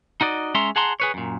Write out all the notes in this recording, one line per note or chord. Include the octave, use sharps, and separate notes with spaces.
D#4 F#4 D5 D#5
G#3 C#4 E5 A#5 C6
G#4 F#5 A5 A#5 C6
G#4 B4 C#5
F#2 A#2